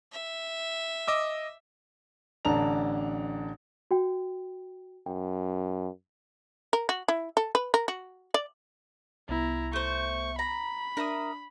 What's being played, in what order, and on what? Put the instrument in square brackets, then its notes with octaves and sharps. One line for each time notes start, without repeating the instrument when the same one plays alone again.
[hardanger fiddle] E5
[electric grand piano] D#5 D6 E6
[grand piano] A1 D3 D4 A5 A#5 F7
[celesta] F#4 G5
[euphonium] F#2 [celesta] G5
[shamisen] A#4
F#4
E4
A4
B4
A#4
F#4
D5
[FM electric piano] C2 B3 [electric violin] E4 A#5
[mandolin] A3 C5 [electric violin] C#6
[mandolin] A#5 [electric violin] B5
[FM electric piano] D4 [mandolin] A#4 E5 D#6